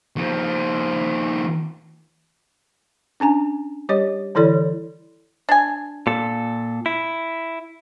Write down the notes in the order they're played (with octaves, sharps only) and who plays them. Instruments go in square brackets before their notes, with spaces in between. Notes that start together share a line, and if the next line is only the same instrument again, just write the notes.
[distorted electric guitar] D#2 F3
[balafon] C#4 D4 G#5 A#5
G3 G4 C#5 D#5
D3 E3 E4 A4 C#5 D5
[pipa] D4 G#5
[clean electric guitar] A#2 A4
E4